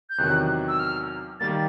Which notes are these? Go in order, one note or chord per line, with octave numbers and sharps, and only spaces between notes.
G6
E2 C3 D#3 F#3 F#6
E6
F6
D#3 G3 A#3 A6